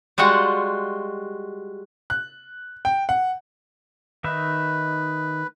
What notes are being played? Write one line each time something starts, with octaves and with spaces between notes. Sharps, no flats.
G3 G#3 F4 F#4 F#5
F#6
G5
F#5
D#3 D#4 B4 E5